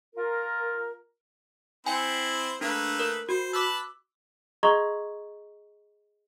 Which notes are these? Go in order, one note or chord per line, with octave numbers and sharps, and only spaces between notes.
F4 A#4
C4 E4 C5 G5 G#5
A3 A#3 D4 B4
A#4
F#4 C5
B4 A5 B5 D6 E6
G#4 D#5 A#5 C6 C#6 G#6